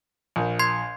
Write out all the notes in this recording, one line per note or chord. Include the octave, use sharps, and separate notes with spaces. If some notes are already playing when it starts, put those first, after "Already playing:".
A#1
C6 G#6 C7